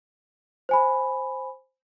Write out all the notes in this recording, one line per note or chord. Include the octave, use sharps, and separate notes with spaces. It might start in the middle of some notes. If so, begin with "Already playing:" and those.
C5 G#5 B5